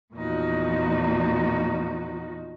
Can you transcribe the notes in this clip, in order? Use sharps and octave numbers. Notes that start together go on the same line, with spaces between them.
E2 A#2 F3 D#4 F#4